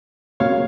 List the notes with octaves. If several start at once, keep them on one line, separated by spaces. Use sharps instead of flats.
C#3 F#3 A#3 C#5 F5